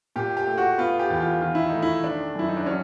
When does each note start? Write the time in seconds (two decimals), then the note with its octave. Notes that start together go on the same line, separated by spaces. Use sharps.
0.16 A#2 G4
0.37 G4
0.47 A3
0.58 F#4
0.78 B3 F4
0.99 G4
1.10 E2
1.21 F4
1.41 D#3 F4
1.55 E4
1.69 A3 D#4
1.82 E4
2.04 D#3 D4
2.35 F#2 E4
2.49 D#4
2.57 D4
2.66 F#3 C#4